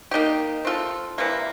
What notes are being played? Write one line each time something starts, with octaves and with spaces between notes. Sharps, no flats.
A#3 D#4 G4
C4 F4 A4
C3 E3 G3 A#3